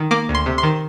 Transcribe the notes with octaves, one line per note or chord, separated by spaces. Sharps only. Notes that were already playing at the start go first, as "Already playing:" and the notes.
Already playing: D#3
A#3 D6
D2
C6
C3
C6
D#3